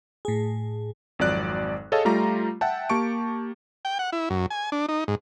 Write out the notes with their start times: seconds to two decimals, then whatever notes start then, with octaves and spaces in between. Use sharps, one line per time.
0.25 A2 G#4
1.19 G#1 F2 F#3 D5 F#6
1.92 G#4 A4 C#5 D#5 F5 A5
2.05 G3 A3 F4 A#5 D6
2.61 E5 F#5 G5 A5
2.89 A#3 G4 A5 C#6 D7
3.85 G5
3.99 F#5
4.12 E4
4.30 F#2
4.50 G#5
4.72 D4
4.89 D#4
5.08 G#2